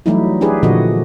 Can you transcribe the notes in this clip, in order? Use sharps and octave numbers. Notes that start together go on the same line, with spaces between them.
E3 F#3 G3 A3 D#4 E4
D4 E4 G4 G#4 B4
A#2 D3 E3 F3 F#4 D#5